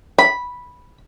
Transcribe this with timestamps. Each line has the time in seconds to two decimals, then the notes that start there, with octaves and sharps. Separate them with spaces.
0.18 B5